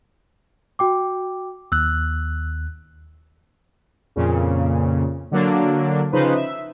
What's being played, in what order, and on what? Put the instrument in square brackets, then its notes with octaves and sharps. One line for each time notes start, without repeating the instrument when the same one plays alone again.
[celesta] F#4 G5 D6
[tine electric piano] D#2 F#6 [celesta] E6
[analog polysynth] F2 A#2 C#3
D3 F#3 A#3 D4
C#3 F3 D#4 B4 C5
E5